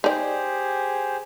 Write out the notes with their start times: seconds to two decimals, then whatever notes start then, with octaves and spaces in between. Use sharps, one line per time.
0.04 D#4 G4 G#4 C5 D5